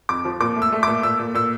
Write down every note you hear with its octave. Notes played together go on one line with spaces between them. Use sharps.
F2 D6
F3
A#2 D6
A3
E6
A3
D6
A#2
A#2 E6
A#2
A#2 E6